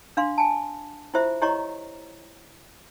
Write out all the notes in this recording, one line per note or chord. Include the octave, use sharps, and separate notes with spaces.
D4 F5 C6
G#5 A5
E4 F4 G4 C5 E5
E4 G4 C#5 D#5 A#5 C#6